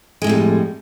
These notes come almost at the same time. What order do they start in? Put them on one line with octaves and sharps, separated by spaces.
G#3 A2 F2 G3